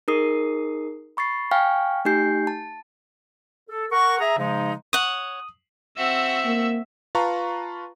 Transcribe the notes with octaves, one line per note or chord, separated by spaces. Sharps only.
D#4 G#4 A#4 D#6 C7
B5 C#6 A6 C7
F5 G5 G#5 C#6 F6
A3 D#4 G4 G#5 G6 C7
A5
A4
A#4 F#5 C#6
G#4 E5 A#5
C#3 F3 G#3 D#4
C#5 F#5 D#6
C4 F#4 E5 E6
A#3
F4 B4 F5 A5 A#5 C#6